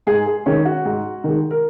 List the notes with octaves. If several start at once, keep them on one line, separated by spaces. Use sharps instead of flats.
G#2 G#4
G#4
D#3 G#3 C#4
F#4
G#2
D#3 G#3
A#4